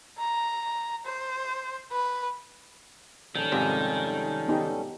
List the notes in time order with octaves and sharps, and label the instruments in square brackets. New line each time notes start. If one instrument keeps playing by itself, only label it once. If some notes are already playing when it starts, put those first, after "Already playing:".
[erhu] A#5
C5
B4
[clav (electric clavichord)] A#1 [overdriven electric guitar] D#3 [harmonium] G3 C#4 A4
[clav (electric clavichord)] F2 G#2 C3
[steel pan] B3 D#4 G4